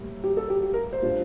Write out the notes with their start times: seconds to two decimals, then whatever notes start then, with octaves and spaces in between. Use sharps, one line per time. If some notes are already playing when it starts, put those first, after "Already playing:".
Already playing: A2 G3 A#3
0.24 G4
0.37 A4
0.50 G4
0.63 G4
0.73 A#4
0.93 C5
1.02 A2 G3 D4 F4